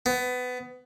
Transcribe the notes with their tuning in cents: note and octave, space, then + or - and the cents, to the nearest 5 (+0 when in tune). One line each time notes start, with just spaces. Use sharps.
B3 +20